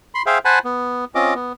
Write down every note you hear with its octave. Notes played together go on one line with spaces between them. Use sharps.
B5 C6
G#4 C5 E5 F5 G5
C5 F#5 G#5 A5 B5
B3
C4 C#4 F4 D#5 D6
B3